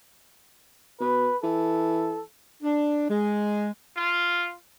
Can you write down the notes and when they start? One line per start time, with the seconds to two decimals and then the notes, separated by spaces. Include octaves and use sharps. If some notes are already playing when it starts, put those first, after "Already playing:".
1.00 B2 B4
1.43 E3 A4
2.63 D4
3.09 G#3
3.97 F4